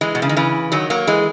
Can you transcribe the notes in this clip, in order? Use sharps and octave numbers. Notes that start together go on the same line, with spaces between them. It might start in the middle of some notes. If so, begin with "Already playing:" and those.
E3 G#3
B2
C#3
D#3
C#3 E3
D#3 F#3
F#3 A#3
E3 G#3